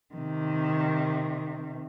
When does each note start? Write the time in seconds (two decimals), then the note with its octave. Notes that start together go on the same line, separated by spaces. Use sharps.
0.15 C3 D#3